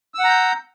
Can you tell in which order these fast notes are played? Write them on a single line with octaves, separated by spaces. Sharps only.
E6 F#5 A#5 G6